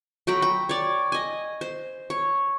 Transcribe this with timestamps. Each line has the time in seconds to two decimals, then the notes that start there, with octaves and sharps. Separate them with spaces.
0.27 F#3 G5 A#5 B5
0.42 G5
0.69 C#5 D5
1.12 D#5 G#5
1.61 C5
2.10 C#5